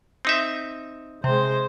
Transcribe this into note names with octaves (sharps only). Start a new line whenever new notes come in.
C4 D#4 E5
C3 G#3 C5